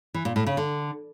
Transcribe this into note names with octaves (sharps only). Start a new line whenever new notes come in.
E3
A#2
A2
C#3
D3